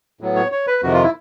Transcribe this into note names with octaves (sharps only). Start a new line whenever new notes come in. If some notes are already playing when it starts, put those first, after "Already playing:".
A2 F#3 B3
C#5
C#5
B4
F2 C3 D#3 F#4
F4
E4